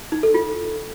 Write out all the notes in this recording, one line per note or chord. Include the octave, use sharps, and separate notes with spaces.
D#4
A4
F4